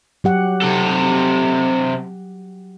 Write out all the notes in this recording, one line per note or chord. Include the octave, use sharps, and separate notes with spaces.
F#3 G4 F#5
C3 A4